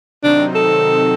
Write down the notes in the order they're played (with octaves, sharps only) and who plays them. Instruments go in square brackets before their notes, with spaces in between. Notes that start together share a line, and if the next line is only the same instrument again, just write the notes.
[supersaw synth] C3 D#3 F#3 C4 D#4 [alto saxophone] D4
[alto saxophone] A4